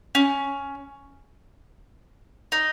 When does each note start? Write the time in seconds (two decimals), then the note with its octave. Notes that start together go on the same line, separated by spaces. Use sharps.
0.15 C#4
2.52 D#4